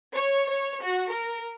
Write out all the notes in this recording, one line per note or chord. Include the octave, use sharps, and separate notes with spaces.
C#5
C#5
F#4
A#4